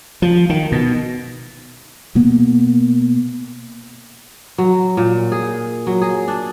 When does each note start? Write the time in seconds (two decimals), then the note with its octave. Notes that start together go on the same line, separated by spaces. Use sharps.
0.22 F3
0.50 D#3
0.72 B2
2.15 B2 A#3 B3
4.58 F#3
4.97 A#2
5.32 G#4
5.87 F#3
6.01 G#4
6.28 D4